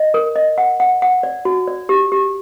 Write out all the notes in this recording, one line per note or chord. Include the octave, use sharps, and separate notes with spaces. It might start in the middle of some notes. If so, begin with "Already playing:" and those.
Already playing: D#5
A#4
D#5
F#5
F#5
F#5
D5
F#4
D5
G4
G4